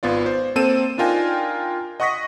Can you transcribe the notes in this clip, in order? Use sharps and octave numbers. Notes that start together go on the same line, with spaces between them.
G#1 B3 F4 D5
C5
A#3 C4 A4 C5 D#7 E7
D4 D#4 F4 A#4 G5 G#5
D#5 F#5 C#6 D#6 A#6 B6